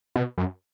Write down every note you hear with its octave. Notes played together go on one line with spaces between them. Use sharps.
B2
F#2